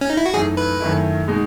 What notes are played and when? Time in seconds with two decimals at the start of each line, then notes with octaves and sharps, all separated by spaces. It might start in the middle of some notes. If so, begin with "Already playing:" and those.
0.01 C#4
0.10 D#4
0.17 E4
0.26 F#4
0.33 F#2 E3 A3 D#4 G#4
0.57 B4
0.80 F#2 D#3 A3 E4
1.28 B2 G#3 D#4